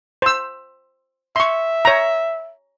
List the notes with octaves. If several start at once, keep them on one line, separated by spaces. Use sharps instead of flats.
C5 E6
E5 C6 C#6
C#5 A#5